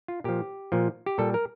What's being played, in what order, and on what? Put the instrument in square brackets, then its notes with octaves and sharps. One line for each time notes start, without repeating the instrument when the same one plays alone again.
[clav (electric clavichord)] F4
A#2 F3 G4
A#2 F3
G4
A#2 G3 A4
A#4